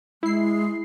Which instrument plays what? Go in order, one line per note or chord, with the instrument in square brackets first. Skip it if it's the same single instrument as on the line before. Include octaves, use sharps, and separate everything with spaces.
[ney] G#3 [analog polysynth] E4 C7